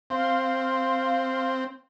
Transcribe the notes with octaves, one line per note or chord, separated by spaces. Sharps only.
C4 F5 C6